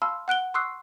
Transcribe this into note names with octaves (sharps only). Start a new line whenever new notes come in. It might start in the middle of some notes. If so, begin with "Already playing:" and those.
F5 A5 B5 C6 E6 F6
F#5 F#6 D7 G7
C6 C#6 D#6 E6 F#6 C7